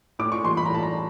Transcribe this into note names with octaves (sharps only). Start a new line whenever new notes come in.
A2 D6
C#6
E3 G3 C6
B5
A#5
A2 A5
A#5